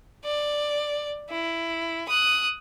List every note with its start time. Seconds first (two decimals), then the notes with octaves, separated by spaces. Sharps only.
0.24 D5
1.29 E4
2.08 D#6 F#6